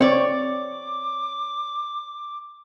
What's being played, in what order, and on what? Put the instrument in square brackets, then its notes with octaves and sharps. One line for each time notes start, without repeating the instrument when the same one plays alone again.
[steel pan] C4 [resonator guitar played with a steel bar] C#5 D5 [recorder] C#6
[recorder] D6